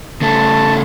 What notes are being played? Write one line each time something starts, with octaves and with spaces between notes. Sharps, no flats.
C#3 A3 A5